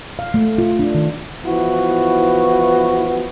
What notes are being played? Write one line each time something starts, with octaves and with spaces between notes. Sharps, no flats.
F5
A3
F4
D4
D#3
E3 F3 B3 E4 F#4